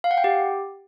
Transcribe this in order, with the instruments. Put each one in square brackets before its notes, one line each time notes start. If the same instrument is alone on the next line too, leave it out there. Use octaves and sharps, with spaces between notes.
[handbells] F5
F#5
G5
G4